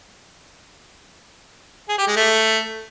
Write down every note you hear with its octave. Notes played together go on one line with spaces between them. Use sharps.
G#4
G4
G#3
A3